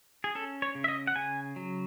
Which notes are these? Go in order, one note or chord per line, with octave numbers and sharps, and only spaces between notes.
G#4
C#4 A4
C#5
C#3
E5
D#5
F#5
C#3 G#5
F#3